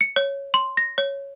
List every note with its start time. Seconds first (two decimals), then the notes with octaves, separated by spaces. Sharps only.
0.01 C#7
0.16 C#5
0.54 C6
0.77 A#6
0.98 C#5